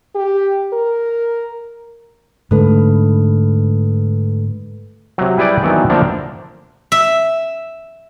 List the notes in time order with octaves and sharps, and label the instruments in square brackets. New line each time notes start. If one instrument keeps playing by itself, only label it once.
[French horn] G4
A#4
[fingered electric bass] G#2 D3 [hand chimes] A3 A4 B4
[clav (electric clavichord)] C3 F#3
G3 E4 G#4 B4 D5 G5
D#3 E3 F#3 B3 C4 D4
D3 F3 A3 A#3 C4 D4
[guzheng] E5